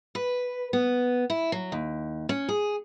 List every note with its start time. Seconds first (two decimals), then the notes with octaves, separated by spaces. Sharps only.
0.15 B4
0.73 B3
1.30 E4
1.52 F#3
1.72 D#2
2.29 C#4
2.49 G#4